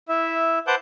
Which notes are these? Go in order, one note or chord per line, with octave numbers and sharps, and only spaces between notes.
E4 E5
B4 C5 F#5 A5 D6 G6